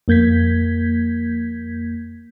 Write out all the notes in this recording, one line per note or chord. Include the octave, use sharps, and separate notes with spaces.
F2 A#3 G6 G#6 B6